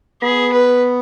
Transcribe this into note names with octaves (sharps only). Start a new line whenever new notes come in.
B3 G#4
B4